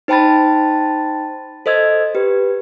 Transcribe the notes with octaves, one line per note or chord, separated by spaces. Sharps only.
D#4 C5 G5 A5 B5 A6
A4 C5 D#5 E6 G#6
G4 B4